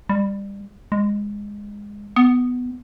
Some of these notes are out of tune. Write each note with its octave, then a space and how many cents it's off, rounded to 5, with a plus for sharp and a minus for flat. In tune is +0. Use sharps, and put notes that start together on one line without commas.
G3 +25
G#3 -15
B3 +10